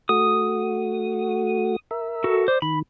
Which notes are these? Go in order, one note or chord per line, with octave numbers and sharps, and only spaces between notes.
A3 F#4 D#6
A#4 E5
F#4 A4
C5 D5
D#3 B5